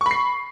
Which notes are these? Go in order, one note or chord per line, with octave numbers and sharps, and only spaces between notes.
B5 C#6 C7